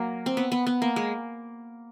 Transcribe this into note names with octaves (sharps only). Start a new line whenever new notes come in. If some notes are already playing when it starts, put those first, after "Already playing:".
Already playing: F#3 A#3
C4
B3
B3
B3
A#3
G#3